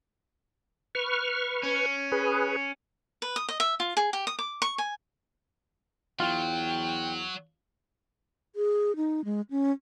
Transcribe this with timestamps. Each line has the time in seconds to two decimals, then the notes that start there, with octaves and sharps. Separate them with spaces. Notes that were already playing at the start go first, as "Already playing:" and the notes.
0.95 B4 C#6 F6
1.63 C#4
2.12 G#4 B4
3.22 B4
3.36 D#6
3.49 D#5
3.60 E5
3.80 F4
3.97 G#4
4.13 G4
4.27 D#6
4.39 D6
4.62 C#6
4.78 G#5
6.20 E2 F#3 F4 G5
8.56 G#4
8.96 D#4
9.25 G#3
9.50 C#4